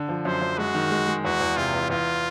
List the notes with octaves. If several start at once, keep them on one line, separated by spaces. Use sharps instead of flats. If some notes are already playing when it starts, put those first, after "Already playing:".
Already playing: D3
F3
F#2 C5
F#2
G#3 F#4
D#3
G#3
G#3
E2 F#4
E2
C3 F4
E2
E2 F4